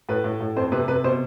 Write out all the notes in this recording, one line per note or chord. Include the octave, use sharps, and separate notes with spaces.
A2 B4
A2
A2
F2 C5
C3 B4
C3 B4
B2 C5